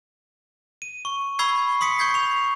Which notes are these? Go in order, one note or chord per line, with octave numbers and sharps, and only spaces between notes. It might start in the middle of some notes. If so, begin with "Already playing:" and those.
D#7
C#6
B5 C#6 E6 G#6 C7
C6 D#6 B6 C#7
C#6 G6 G#6 B6 C7
C#6 F7